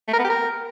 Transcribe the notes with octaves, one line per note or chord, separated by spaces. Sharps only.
A3
A#4
B3
G4
A#4